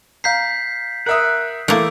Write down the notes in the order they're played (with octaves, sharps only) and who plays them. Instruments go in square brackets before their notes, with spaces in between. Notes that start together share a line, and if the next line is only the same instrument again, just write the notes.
[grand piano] F5 A#5 [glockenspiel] G6 B6 C7
[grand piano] A#4 E5 D#6 [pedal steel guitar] F#5
[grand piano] E3 [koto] A3 A#3 [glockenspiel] D6 E6 D7